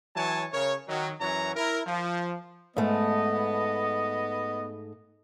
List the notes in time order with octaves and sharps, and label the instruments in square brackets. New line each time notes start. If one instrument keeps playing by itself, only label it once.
[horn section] E3 F#3 C#5 G#5 A5
C#3 A#4 C#5
D#3 F#3
F#2 E3 F#3 C#5 A#5
E4 A#4
F3
[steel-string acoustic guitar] G#2 A3 [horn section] B3 D#5